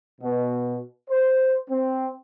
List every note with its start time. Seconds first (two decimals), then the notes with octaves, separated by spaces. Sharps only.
0.21 B2
1.09 C5
1.69 C4